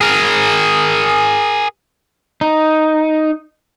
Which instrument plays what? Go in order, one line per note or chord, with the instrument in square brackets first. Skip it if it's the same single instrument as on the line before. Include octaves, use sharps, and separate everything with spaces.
[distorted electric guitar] G#4 A#4
[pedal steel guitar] D#4